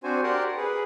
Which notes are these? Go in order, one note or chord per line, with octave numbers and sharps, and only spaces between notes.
C4 D4 F#4 C5 G#5
G4 A#4 D5 F#5 C6
G#4 B4